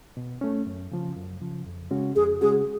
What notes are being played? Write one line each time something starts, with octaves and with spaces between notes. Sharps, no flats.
B2
A3 C#4
F#2
C#3 F3
F#2
C#3 F3
F2
C#3 G#3 C#4 F#4
F2 G#4
C#3 G#3 C#4 F#4 G#4